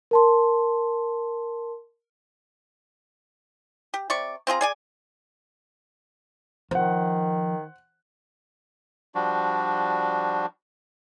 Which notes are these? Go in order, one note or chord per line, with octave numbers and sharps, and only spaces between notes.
A#4 A5 C6
G4
C3 D5 C#6
C4 F4 G#4 A#5
G#4 D5 G#5
D#3 F3 C5 F#5
F3 G3 D4 F#4